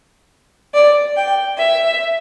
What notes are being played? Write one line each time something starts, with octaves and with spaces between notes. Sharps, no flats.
D5
G5
E5